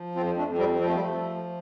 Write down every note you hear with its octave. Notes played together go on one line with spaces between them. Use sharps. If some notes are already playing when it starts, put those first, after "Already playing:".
Already playing: F3
F2 C4 F4
A3 D4
F2
G3 C4
F3 C4
A3
G3
A3
F3